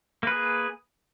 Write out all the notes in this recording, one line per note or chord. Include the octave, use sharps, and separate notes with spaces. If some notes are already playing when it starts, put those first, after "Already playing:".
A#3 G#4 B4